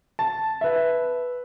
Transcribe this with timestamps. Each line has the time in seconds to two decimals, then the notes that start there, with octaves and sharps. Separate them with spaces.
0.19 A5
0.61 B4 E5